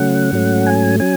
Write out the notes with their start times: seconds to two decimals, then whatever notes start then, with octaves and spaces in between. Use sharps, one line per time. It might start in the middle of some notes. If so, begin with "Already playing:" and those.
Already playing: C#3 F#3 A3 C#4 F#5
0.32 G#2 F#3 A3 C#4
0.66 G#5
1.00 F#3 C#4 G#5